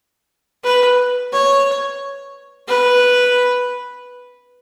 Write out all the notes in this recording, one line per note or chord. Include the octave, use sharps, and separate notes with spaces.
B4
C#5
B4